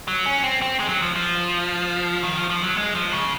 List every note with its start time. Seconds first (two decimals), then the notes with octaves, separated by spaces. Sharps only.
0.08 F#3
0.26 C#4
0.44 C4
0.62 C4
0.80 G#3
0.89 F#3
1.02 F3
1.16 F3
2.23 D#3
2.36 F3
2.50 F3
2.64 F#3
2.77 G#3
2.95 F3
3.13 C#3